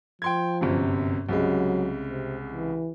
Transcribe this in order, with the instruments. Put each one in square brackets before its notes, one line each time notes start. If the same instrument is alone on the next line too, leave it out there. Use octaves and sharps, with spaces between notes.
[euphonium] F3 [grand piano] G5 C6 G#6
[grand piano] G1 F#2 C3
[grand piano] C2 C#3 G#3 [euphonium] F#3
[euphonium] C3
E3